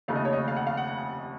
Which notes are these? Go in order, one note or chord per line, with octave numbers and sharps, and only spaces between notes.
F1 D#2 C#3 A3 D#4 F5
D#5
C#5
D#5
F5
F#5
F5
F#5